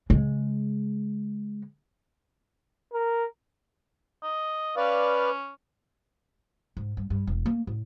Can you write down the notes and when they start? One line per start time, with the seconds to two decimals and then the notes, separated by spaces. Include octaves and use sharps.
0.10 C#3 G#3
2.93 A#4
4.23 D#5
4.77 C#4 B4 D5 F5
6.77 G#2
6.97 G2
7.10 G2
7.27 E1
7.46 A#3
7.67 A2